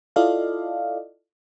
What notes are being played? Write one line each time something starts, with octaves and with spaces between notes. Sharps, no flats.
E4 F4 A4 D5 D#5 F5